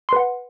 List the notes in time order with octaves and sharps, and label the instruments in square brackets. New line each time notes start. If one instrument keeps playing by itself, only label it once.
[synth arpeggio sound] C6
B4
F#5